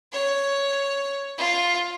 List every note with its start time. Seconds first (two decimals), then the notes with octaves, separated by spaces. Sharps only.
0.12 C#5
1.38 F4